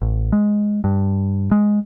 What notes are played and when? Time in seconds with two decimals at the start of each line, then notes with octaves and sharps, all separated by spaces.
0.02 A1
0.32 G#3
0.84 G2
1.51 G#3